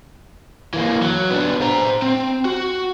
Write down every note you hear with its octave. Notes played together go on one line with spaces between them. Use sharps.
E3 A#3
F#3
B3 D4
C5 A#5
C4
F#4